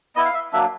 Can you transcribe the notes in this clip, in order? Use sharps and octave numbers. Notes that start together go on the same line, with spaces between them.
B3 E4 D#5
F5
E5
F#3 A#3 D4 E5